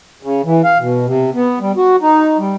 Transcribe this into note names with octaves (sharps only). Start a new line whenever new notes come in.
C#3
E3
F5
B2
C3
B3
G3
F#4
D#4
G3